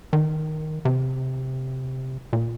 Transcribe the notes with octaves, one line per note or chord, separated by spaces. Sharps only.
D#3
C3
A#2